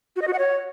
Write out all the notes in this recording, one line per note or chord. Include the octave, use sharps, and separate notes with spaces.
F#4
D#5
F#4
F#5
C#5